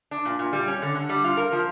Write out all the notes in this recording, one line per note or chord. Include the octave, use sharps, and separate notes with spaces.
D4
A#2
A#2
G3
C#4
D3
D3
G3
F4
A#4
F3